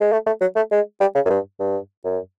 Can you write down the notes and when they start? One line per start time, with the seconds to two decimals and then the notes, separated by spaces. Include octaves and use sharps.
0.01 G#3
0.12 A3
0.26 A3
0.41 F#3
0.56 A3
0.71 G#3
1.00 G3
1.15 C#3
1.25 F#2
1.30 G2
1.60 G2
2.04 F#2